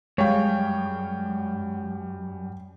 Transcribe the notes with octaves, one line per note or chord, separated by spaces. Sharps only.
F#2 G3 G#3 C#5 F5 G5